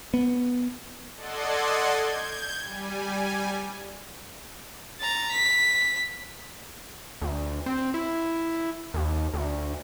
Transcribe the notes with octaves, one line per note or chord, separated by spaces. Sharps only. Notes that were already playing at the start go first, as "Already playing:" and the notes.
B3
A4 D5 D#5 F#5 C6 G#6
G6 G#6
G3 G#5
A#5 A6
B6
D2
C4
E4
D#2
D2